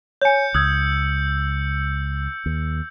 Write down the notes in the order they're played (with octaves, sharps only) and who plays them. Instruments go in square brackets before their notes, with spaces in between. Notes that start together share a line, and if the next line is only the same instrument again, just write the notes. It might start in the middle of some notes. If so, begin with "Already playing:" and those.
[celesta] C#5 G#5 [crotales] G6 C#7
[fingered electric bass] C#2 [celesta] D#6 F#6 G#6 [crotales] E6
[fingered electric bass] D#2